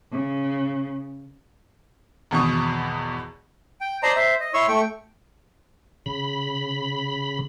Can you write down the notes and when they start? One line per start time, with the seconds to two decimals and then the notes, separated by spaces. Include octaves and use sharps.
0.11 C#3
2.31 G#1 E2 B2 C#6 D#6
3.81 G5
4.03 C5 D5 D#5 A5 A#5 C6
4.16 C5 E5
4.40 D#5
4.54 E4 C#5 C6 C#6 E6
4.68 A3 G5 C#6
6.06 C#3 B5